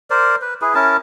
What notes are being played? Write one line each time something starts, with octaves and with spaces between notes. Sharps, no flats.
A#4 C5 D5
B4
E4 G#4 B4
C#4 E4 A#4 A5